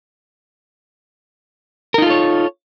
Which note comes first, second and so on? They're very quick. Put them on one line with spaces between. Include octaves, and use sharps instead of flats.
A#4 D#4 F4 A4 C#5